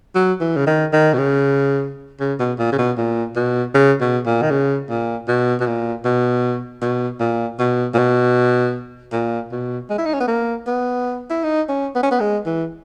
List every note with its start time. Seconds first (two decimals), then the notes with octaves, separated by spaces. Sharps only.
0.15 F#3
0.41 E3
0.56 C#3
0.67 D#3
0.93 D#3
1.14 B2
1.18 C#3
2.21 C#3
2.40 B2
2.59 A#2
2.72 C#3
2.79 B2
2.98 A#2
3.36 B2
3.74 C#3
4.01 B2
4.26 A#2
4.42 D#3
4.51 C#3
4.90 A#2
5.28 B2
5.61 B2
5.67 A#2
6.05 B2
6.82 B2
7.20 A#2
7.59 B2
7.94 A#2
7.98 B2
9.13 A#2
9.52 B2
9.90 G#3
9.98 E4
10.06 D#4
10.14 C#4
10.20 B3
10.28 A#3
10.67 B3
11.30 E4
11.44 D#4
11.69 C#4
11.95 B3
12.03 C#4
12.11 B3
12.20 G#3
12.46 E3